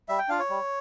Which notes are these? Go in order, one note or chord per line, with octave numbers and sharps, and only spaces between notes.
G3 E5
G5
D4 F4 F5
C#5
G3